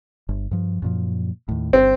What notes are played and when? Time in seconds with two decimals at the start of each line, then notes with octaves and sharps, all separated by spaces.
0.29 G1
0.51 G2 F3
0.82 F#2 A#2 F3
1.49 D#2 A2
1.73 G1 C4